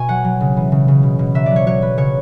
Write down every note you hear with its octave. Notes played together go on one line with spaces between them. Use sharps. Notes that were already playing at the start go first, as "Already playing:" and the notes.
Already playing: B2 G#5 C#6
F#3 F#5
F#3
C#3
E3
C#3
C#3
B2
B2
F#3 E5
F#3 D5
C#5
F#3 C#5
F#3 B4
C#3 C#5